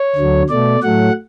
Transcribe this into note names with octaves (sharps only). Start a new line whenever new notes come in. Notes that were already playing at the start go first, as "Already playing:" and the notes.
Already playing: C#5
D2 D3 F#3
B2 A3 D5
A2 F#3 A3 F#5